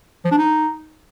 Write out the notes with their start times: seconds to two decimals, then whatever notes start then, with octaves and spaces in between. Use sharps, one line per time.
0.25 F3
0.31 D4
0.38 D#4